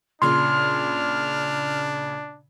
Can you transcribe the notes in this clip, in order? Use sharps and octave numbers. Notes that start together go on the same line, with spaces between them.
A#2 C#3 D4 C6 F6